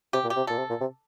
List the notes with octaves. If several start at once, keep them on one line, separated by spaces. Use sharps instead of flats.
C3 G4
A#2
G4
C3
A#2 A4
C3
A#2
C3